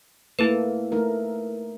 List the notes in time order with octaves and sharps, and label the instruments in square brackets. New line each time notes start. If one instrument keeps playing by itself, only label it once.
[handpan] A3 A#3 [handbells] E4 A4 B4
[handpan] A3 D#4 A#4